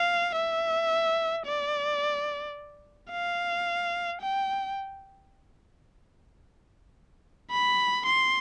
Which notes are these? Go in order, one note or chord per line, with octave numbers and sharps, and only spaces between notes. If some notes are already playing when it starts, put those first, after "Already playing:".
Already playing: F5
E5
D5
F5
G5
B5
C6